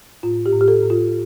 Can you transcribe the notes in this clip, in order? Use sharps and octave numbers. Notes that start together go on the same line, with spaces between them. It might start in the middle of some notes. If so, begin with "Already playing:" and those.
A2 F4
G4
A2
G4
A4
A2
F4